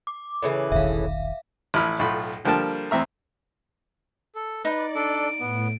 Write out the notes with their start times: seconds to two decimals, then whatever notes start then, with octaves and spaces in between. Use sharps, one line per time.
0.07 D6
0.43 A2 C#3 E3
0.72 E1 A#1 D#3 E5 F5
1.74 A1 F3 E4 B5 F6
1.99 B1 A2 F4 B5
2.45 D3 F3 G3 A#3 G5 A5
2.91 E2 C4 E5 A#5
4.35 A4
4.65 D#4 B4 D5
4.95 D4 A4 D7
5.40 A2 B3